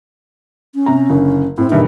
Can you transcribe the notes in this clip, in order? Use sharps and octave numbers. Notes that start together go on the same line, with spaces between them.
C#4
C3 A#5
F#1 D3
A2 C4
E1 G2 D#3 E5